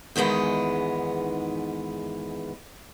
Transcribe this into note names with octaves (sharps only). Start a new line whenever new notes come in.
E2 G#2 D#3 G#3 B3